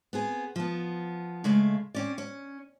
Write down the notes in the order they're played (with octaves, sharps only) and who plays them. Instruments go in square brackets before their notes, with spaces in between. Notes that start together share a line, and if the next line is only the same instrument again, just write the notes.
[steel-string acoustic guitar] B3 C4 G#4
F3 B3
C#3 G#3 A3 F5
C4 C#4 D5
C#4